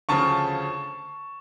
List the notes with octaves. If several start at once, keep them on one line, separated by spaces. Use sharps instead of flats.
D2 C#3 F3 A5 C#6